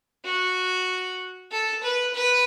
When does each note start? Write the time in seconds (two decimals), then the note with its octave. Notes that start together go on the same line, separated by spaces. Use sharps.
0.24 F#4
1.51 A4
1.83 B4
2.14 B4